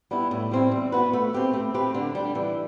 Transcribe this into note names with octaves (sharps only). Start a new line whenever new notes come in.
G3 B3 E4
A2
G3 C4 E4
E3
B3 F#4 B4
A3
C4 G4 B4
A3
C4 G4 B4
D3
G3 D4
E3